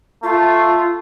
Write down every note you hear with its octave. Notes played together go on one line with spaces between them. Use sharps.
A3 F4